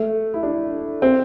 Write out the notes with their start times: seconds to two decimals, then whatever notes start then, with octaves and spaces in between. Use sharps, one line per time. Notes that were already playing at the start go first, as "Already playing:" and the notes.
Already playing: A3
0.34 E4
0.43 D4
1.02 C4